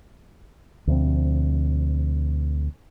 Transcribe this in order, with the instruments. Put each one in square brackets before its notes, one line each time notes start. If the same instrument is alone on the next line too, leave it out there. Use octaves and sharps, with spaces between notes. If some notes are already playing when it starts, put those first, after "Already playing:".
[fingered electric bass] D2 B2 F3 C4